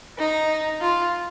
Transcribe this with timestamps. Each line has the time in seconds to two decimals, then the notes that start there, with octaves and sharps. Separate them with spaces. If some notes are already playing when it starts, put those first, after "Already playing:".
0.18 D#4
0.81 F4